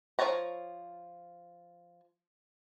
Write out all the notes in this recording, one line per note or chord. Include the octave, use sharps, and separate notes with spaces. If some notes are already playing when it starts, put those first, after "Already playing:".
F3 A4 C#5 A5 A#5